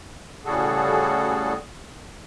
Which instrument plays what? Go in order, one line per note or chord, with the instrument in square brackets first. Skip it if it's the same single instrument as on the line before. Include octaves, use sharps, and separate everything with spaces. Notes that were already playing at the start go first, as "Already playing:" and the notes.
[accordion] A2 C#3 G3 F#4 G#4 A4